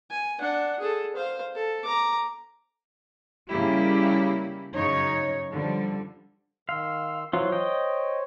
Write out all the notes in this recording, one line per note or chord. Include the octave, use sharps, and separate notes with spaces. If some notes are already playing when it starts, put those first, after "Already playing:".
G#5
D4 F#5
G#4 A4
C5 F5
A4
A#5 D6
C#3 G3 A#3 E4 G4
F#2 C#3 D#4 C#5
D3 F3 G3
D#3 F5 C6 E6
E3 F#3 F4 C5 C#5
D#5 G5